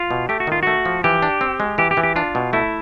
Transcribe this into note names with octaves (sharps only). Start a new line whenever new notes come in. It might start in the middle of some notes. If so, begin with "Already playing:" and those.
Already playing: F4
B2
A3 G4
F#4
D#3 F4
A3 F#4
F3
E3 G4
D4
C4
G#3
E3 G4
G4
E3
G4
D4 F4
B2
A3 E4